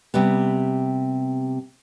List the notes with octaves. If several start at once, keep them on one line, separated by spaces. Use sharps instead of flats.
C3 G3 B3